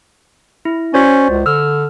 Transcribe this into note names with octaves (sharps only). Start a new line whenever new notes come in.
E4
C#4 F#4 C5 D5
C#2
D3 E6 F6